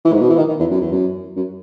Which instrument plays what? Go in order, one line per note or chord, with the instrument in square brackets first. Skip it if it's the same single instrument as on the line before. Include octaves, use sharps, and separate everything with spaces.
[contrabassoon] E3
G#2
B2
E3
D#3
D#3
E2
F#2
E2
F#2
F#2